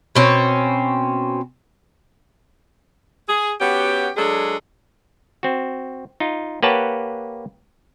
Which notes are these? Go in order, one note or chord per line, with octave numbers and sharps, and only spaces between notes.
B2 C4 C#4
G#4
B3 C#4 F#4 G4
F#3 G#3 D4 G#4 A4
C4 F#4
D#4 F4
A#3 G4 B4 C#5 F#5 A5